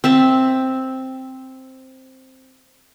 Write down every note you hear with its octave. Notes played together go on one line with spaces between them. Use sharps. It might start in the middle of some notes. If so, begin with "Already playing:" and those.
C4 E5 A5